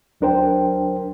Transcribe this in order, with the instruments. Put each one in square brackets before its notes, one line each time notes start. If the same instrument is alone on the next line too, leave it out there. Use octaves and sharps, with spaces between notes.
[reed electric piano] D2 F#3 D4 A#4 C5 G5